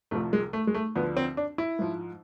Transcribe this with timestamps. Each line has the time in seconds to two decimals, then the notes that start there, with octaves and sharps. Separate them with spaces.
0.11 C2 C3 F3 A3
0.33 G#3
0.53 A3
0.67 G#3
0.74 A3
0.95 D2 D3 F3 B3
1.17 C4
1.37 D4
1.58 E4
1.79 G#2 F3